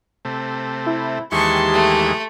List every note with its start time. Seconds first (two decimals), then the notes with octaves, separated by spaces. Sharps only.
0.25 C3 A3
0.86 E4
1.32 D#2 E3 G#3 G4 A5 C6 C#6
1.74 A3